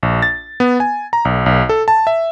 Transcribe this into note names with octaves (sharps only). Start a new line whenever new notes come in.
A#1
A6
B3
G#5
A#5
B1
B1
A4
A5
E5